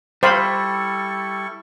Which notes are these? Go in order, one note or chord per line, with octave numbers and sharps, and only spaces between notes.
G3 E4 A4 C5 F5 B5 C#6